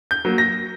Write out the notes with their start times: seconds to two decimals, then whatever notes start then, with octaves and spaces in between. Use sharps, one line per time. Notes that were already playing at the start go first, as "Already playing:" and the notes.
0.11 G6
0.25 F#3 A#3
0.38 A#6